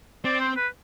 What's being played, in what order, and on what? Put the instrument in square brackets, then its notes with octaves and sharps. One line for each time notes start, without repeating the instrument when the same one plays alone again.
[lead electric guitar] C4 [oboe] D5
[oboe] C5
B4